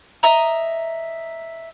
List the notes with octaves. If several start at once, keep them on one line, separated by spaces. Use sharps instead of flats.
D#5 E5 A#5